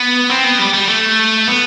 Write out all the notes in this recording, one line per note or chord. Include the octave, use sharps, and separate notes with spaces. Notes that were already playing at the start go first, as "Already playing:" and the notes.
Already playing: B3
C4
B3
G3
G3
A3
B3